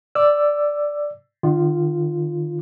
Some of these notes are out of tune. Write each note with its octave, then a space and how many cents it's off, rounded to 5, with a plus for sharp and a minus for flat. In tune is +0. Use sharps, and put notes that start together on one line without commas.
D5 +0 E6 +15
D#3 -45 F4 -5